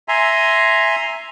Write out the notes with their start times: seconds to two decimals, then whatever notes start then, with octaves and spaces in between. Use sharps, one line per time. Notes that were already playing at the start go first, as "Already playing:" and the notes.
0.08 E5 G#5 A#5 C6